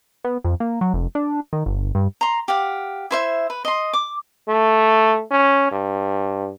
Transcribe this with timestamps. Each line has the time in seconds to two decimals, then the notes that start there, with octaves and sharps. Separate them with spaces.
0.24 B3
0.44 F2
0.60 A#3
0.81 F#3
0.94 F1
1.15 D4
1.53 D#3
1.66 G1
1.95 G2
2.21 A#5 C6
2.48 G4 F5 F#5
3.11 E4 C5 E5
3.50 B4
3.65 D#5 C6
3.93 D6
4.48 A3
5.31 C#4
5.71 G2